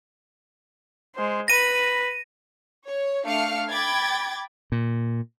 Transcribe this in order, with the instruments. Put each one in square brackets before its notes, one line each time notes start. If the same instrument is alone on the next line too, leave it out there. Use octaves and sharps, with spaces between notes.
[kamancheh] G#3 C5
[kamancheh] B4 B5 [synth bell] A#6 D#7
[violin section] C#5
A3 D4 F5 F6 C#7
G5 B5 D6 G#6 A6
[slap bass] A#2